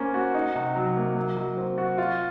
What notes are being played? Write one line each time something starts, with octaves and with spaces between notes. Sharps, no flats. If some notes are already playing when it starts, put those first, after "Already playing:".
Already playing: A#3 C#4 C5
F#4
D#4
C3
F#3
A#3
F#3
F#3
C4
F#4
F4